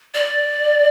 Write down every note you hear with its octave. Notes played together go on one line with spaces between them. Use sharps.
D5